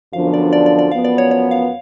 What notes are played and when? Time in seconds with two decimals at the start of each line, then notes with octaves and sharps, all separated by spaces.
0.13 F#2 D3 F3 B3 D4 F5
0.34 D5
0.53 D5
0.66 D5
0.79 D5
0.91 F#2 F3 B3 F5
1.05 D5
1.18 C#5
1.31 C#5
1.51 F5